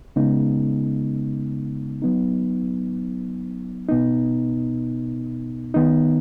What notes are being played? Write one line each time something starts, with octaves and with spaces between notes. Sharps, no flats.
C#3 G#3 B3 D#4
F#3 B3 D#4
B2 B3 D#4
D#3 B3 D#4